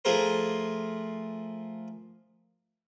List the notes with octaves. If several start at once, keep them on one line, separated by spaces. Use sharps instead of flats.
F3 A3 F4 G#4 A#4 C5